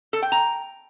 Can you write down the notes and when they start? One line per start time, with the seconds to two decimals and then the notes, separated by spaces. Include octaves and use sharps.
0.13 A4
0.22 G5
0.32 A#5